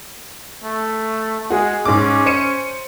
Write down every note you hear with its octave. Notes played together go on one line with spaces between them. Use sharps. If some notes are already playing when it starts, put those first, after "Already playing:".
A3
G#3 F#4 G#4
G#2 C#4 D6
C5 C#7 D#7